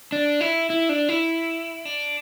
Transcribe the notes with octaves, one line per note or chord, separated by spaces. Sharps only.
D4
E4
E4
D4
E4
D4